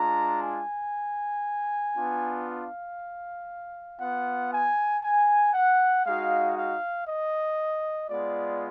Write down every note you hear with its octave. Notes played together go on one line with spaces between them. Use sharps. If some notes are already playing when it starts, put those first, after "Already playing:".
Already playing: G#3 D4 F4 A#5
G#5
B3 D4 F4
F5
B3 F4 F#5
G#5
G#5
F#5
G#3 D#4 F#4 F5
F5
D#5
G#3 B3 F4 D5